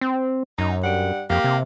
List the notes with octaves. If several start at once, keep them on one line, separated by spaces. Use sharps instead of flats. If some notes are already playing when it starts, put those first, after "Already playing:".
C4
F#2 D#4
G2 G3 F#5
F2 A#3 G4
C3